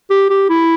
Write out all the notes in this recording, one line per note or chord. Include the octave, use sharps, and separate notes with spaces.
G4
G4
E4